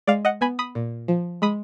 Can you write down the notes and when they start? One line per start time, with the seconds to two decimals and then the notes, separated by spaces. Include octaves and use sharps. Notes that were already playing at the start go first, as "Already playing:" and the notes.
0.07 G#3 D5 F5
0.25 D#5 F#5
0.41 B3 G#5 B5
0.59 B5 D#6
0.75 A#2
1.08 F3
1.42 G#3 B5 D#6